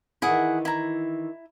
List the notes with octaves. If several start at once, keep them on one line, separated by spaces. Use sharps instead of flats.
D#3 E3 E4 G#4 F#5
E4 A#5